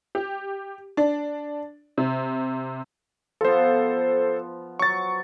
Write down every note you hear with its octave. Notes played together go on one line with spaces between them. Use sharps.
G4
D4
C3
F3 B3 A4 C5
F#3 C#6 A6